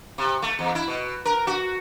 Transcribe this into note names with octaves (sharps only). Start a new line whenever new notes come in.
C3
A3
E2
E4
B2
A#4
F#4